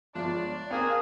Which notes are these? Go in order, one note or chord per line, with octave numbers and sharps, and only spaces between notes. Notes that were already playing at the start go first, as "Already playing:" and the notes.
G1 F3 G#3 D4 D5
A#3 C4 G#4